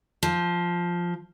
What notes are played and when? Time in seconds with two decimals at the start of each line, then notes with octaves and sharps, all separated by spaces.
0.23 F3